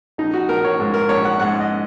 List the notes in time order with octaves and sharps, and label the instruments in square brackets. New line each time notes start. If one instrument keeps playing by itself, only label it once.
[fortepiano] A#1 D#4
F#4
A#1 A#4
C#5
G#2
A#4
A#1 C#5
F#5
G#2 F#5
D#5